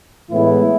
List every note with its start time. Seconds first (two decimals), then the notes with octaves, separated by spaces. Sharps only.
0.30 A2 E3 G#3 B3 E4